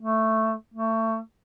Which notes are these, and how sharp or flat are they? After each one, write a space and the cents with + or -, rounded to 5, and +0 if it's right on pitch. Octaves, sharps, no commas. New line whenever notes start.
A3 +5
A3 +25